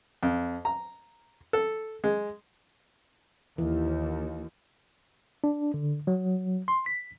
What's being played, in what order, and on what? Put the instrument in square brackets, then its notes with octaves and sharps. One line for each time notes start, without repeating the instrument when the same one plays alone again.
[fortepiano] F2
A#5
A4
G#3
[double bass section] D#2 [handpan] E3
[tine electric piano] D4
D3
F#3
C6
B6